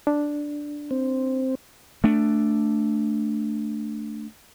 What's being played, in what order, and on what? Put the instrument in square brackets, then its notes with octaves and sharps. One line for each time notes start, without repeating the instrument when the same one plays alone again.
[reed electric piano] D4
[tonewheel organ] C4
[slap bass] A3 D4